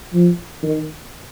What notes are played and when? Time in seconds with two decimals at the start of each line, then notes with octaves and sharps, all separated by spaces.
0.14 F3
0.63 D#3